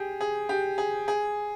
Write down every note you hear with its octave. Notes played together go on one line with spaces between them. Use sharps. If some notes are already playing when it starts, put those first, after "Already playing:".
Already playing: G4 G#4
G#4
G4
G#4
G#4